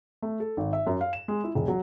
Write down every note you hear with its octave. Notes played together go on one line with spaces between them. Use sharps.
A3
A4
G#1
E5
F#2
F5
E7
G#3
E4
E1
F#3